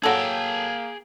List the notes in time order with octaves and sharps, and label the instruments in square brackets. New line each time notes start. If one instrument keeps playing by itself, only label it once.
[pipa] F#3 A4 [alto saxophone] A#3 [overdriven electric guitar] G#4 G5